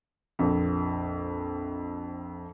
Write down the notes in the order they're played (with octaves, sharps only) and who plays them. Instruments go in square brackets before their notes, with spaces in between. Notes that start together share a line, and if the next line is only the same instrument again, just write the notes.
[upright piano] A#1 F2